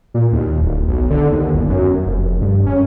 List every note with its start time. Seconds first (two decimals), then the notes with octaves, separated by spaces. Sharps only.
0.14 A#2
0.32 D#2
0.62 D1
0.88 B1
1.10 D3
1.32 D#2
1.54 G1
1.69 F#2
2.06 F1
2.23 F1
2.42 G2
2.66 C#4